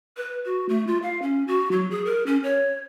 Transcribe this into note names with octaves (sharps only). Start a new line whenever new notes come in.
B4
F#4
A3
F4
F5
C#4
F#4
F#3
G#4
A#4
C#4
C#5